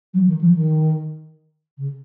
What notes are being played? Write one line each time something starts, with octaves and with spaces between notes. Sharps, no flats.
F#3
D#3
F3
D#3
C#3